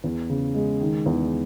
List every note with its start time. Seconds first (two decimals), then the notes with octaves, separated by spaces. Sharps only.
0.04 E2
0.30 C#3
0.55 G#3
0.81 D#3
1.06 E2